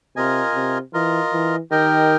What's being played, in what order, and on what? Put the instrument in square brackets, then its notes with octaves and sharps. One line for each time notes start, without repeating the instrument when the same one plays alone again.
[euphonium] C3 [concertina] F4 A#4 D#5 G#5
[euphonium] C3
[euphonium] E3 [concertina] F4 A#4 D#5
[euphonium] E3
[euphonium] D#3 [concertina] G4 A#4 D#5 G5